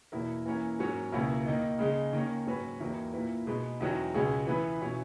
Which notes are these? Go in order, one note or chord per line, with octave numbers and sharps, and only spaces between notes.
E2 B2 A#3 E4 A#4
E3 A#3 C#4 E4 A#4
G#2 F#3 C#4 F#4 A#4
C#2 B2 A#3 C#4 E4
D#3 A#3 D#4
C#3 G#3 D#4
D#3 A#3 C#4
G#2 F#3 C#4 F#4 B4
E2 D#3 F#3 A#3 E4
A#2 A#3 E4 B4
B2 G#3 B3 D#4 G#4
E2 D#3 F#3 C#4 F#4
C#2 B2 G#3 C#4 G#4
E3 B3 E4 B4
B2 F#3 C#4 E4